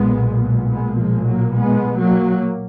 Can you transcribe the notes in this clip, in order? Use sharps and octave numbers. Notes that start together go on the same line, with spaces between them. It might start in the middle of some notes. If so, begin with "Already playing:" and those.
Already playing: B1 A#2 G#3 B3
G#3 B3
F3 G#3
F#3 A#3
G#3 B3
F#3 A#3